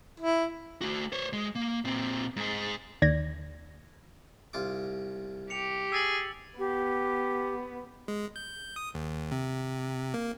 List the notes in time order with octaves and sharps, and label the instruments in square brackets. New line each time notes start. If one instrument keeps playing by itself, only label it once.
[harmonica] E4
[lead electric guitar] A3 F#4
C5 C#5
G#3
A#3
A#2 C4
G#2 G#4
[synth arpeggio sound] D#2 D5 G#6 A#6
[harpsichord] C2 F4 D6
[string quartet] G4 [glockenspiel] C#7 F7
[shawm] G#4 [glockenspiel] E6 A6 F#7
[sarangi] B3 [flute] G4
[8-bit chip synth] G#3
G6
D#6
D#2
C3
A#3